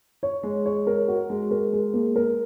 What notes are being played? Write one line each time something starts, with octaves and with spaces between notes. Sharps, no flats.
C#5
G#3
C#5
A#4
F#4
G#3
A#4
G#3
A#3
A#4